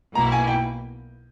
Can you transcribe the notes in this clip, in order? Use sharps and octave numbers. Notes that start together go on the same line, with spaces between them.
B1 B2 A#3 E4 A#5
G#5
G5